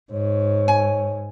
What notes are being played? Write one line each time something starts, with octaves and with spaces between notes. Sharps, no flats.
G#2 C#5
G#5